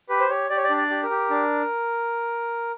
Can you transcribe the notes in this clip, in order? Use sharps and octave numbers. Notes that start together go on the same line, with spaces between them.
G4 B4
C5
G4 C#5
G4 D5
C#5
D5
D4
D5
G4
A#4
G4
D4